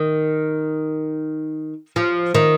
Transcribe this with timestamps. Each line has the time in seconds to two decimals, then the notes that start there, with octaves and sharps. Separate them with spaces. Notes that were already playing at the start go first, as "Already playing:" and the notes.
Already playing: D#3
1.96 F3
2.35 D#3